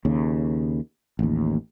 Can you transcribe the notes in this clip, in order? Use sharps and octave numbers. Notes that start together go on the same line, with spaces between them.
D#2 C#3
A1 D#2